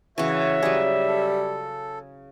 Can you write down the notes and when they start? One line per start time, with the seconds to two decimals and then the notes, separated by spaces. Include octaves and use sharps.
0.18 C#3 E3 F#4 C#5 E5
0.63 F#3 G3 G#4
1.07 A4